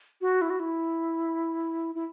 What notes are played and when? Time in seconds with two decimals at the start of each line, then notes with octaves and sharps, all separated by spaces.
0.21 F#4
0.42 E4
0.50 F#4
0.60 E4
1.95 E4